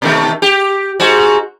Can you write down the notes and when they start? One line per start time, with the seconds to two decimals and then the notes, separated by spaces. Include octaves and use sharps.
0.02 B2 D#3 A3
0.42 G4
1.00 G#2 F#4